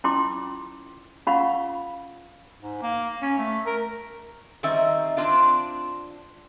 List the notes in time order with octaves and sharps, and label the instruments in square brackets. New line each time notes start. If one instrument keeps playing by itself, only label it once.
[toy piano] C#4 E4 F4 G5 C6 D6
C#4 F4 F5 F#5 B5 C#6
[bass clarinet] G#2
A#3
C#4
A3
A#4
[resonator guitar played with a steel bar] D#3 G3 C4 D#4 E5
C4 D4 F4